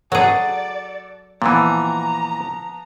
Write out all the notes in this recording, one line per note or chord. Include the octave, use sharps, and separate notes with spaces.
F#3 F#4 G#4 A4 C5 D5
A#2 E3 F3 B3 A#5